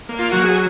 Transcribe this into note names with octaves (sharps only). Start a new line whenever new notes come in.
A#3
F4
F#3 F#4
G#4